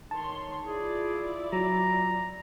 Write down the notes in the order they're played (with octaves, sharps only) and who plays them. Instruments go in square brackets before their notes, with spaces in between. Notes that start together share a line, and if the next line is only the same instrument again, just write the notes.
[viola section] D#3 C#5 C6 [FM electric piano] A5
[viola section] E4 F4 D5 [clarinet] G#4
[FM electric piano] F#3 [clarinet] A#5